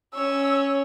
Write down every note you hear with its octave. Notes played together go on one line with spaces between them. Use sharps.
C#4 C#5 E6